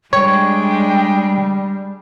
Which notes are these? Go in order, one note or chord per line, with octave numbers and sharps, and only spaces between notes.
G3 G#3 D4 C#5 G5